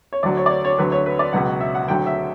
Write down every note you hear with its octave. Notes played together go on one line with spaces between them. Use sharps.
C#5
D2 D3 F#3 D5
C#5
D5
C#5
C#5
D2 D3 F#3 B4
C#5
B4
D5
C#2 B2 F#3 F#5
E5
F#5
D2 D3 F#3 G5
E5